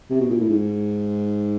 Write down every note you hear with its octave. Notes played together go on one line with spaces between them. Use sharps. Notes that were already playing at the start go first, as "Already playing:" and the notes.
C3
B2
A#2
A2
G#2